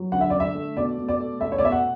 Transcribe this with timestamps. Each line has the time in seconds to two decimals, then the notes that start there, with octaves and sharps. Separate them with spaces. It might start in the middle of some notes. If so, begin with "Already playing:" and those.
Already playing: F#3
0.12 D3 F#5
0.21 E5
0.30 D3 D5
0.40 E5
0.55 A3
0.76 B2 D5
0.98 B2
1.08 D5
1.19 A3
1.40 A3 E5
1.52 C#5
1.58 D5
1.62 B2 E5
1.72 F#5